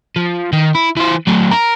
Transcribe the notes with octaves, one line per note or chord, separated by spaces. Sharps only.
F3
D#3
E4
E3 C5
F#3 A3
A#4